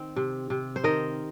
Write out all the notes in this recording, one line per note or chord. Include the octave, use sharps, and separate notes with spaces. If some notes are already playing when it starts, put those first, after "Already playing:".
Already playing: D#3 C4
C3
C3
C5
D#3 A#4 D#5